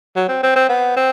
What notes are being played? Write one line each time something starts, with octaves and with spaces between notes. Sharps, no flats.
F#3
C4
C4
C4
B3
C4